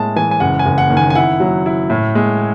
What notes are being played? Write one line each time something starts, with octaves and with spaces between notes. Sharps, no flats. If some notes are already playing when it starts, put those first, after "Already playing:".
Already playing: A2 G#3 A5
E3 G#5
G#5
F#1 F#5
G#5
F#1
F#5
D#3
G#5
G#5
E4 F#5
F#3
E4
A2
G#3